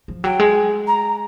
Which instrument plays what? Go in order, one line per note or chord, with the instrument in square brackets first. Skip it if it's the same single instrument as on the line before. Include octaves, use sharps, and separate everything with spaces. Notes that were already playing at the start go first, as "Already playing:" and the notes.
[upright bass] F3
[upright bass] F#3 [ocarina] G5
[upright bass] G#3
[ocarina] A#5